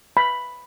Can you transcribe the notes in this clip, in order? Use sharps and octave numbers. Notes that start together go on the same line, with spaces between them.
B5